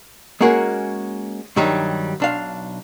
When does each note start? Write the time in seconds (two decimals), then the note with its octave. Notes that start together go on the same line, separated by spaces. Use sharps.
0.41 G#3 A#3 C#4 F#4 G#4 A#4
1.56 G2 D#3 F#3 G3 D#4
2.20 B1 D4 F5